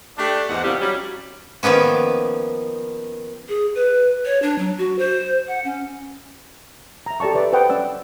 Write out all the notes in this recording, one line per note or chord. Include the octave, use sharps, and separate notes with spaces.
A3 D4 G4
E2 G#2 F#5
C3 D#3 F3 G3 C4 G4
F#3 G3 C#4
D#3 F3 A#3 B3 C#4
G#4
B4
C#5
D4
F#3
F#4
C5
F#5
C#4
E5 A#5
G4 A4 D5 A5 C#6
B4 D5 E5
B4 C5 F#5 G5 A5 D#6
C#4 D5 E6